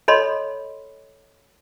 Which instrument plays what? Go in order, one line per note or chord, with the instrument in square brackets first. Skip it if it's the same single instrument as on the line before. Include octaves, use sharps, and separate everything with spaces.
[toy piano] A4 C#5 D#5 B5 C6